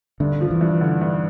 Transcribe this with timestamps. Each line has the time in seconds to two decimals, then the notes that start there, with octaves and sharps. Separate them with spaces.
0.20 G2 D3
0.41 F3
0.51 E3
0.61 G2
0.81 D3
1.01 G2